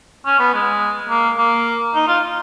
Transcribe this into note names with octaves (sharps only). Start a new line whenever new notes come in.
C#4
B3
G#3
A#3
A#3
D#4
F4